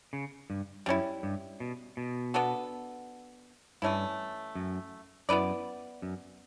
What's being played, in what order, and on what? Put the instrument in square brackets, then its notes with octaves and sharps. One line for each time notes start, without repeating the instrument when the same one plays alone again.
[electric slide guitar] C#3
G2
[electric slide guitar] F#2 [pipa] G3 C#4 E4
[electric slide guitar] G2
B2
B2
[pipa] B3 D4 F#4 A4
[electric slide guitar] G2 [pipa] E3 A3 C#4 E4
[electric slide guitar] F#2
[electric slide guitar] F#2 [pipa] B3 E4 B4 D5
[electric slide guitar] F#2